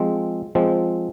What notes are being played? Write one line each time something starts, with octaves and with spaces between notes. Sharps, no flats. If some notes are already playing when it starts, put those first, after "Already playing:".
Already playing: F3 G#3 C4
F3 G#3 C4